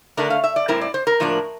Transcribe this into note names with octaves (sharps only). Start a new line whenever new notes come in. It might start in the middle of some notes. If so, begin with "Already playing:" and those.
D3 A3 D4 A#4
F5
E5
D5
A2 G3 C4 E4 A#4
D5
C5
A#4
A2 F3 A#3 D4